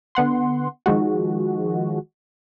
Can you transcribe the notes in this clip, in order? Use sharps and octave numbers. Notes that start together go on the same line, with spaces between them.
D3 B3 F#5 C6
D#3 F3 G#3 F#4